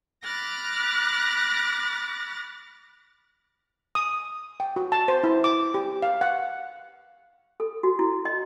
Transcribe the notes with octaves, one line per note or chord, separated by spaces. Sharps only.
B5 D6 F6 F#6 A6 A#6
D#6
G5
F#4
A5
C5
E4
D6
G4
F5
F#5
A4
F#4
E4
D#5